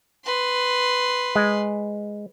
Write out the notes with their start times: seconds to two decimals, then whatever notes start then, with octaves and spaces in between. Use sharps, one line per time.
0.25 B4 C6
1.35 G#3